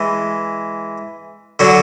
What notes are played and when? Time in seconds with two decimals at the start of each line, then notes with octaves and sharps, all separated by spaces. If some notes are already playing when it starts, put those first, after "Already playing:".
Already playing: E3 G#3
1.59 D3 F#3